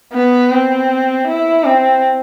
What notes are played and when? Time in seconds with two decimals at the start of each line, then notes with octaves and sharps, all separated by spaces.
0.13 B3
0.51 C4
1.27 E4
1.64 C4